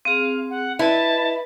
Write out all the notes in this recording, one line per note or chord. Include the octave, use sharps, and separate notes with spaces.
C4 G#4 F5
F#5
E4 B4 D#5 A5